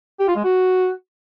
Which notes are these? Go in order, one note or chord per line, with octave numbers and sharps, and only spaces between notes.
G4
F4
G#3
F#4